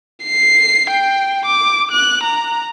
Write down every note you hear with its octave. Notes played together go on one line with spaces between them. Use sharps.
C7
G5
D6
F#6
A#5